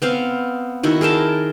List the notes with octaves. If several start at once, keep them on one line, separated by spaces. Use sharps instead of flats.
B3 C4 F5
D#3 E4 F#4
G#4 A#4 G5 A5